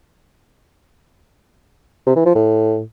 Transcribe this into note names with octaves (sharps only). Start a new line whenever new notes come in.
C3
E3
F3
A2